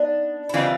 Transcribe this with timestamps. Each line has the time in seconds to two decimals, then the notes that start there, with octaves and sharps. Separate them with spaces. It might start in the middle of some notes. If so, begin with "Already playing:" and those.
Already playing: B3 D4 D#4
0.49 E4
0.54 C#3 E3 G3 C4 D#4 F4